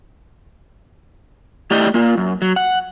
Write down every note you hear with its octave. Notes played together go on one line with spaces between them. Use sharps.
A3 E4 G4 D5 D#5 G5
A#3 F4
F#2
F#3
F#5